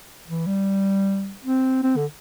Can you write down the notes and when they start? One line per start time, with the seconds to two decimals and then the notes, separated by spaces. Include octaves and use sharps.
0.28 E3
0.47 G3
1.45 C4
1.83 C4
1.96 D3